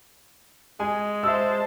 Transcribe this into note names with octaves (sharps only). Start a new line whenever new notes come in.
G#3 G#5
C5 E5 A5 E6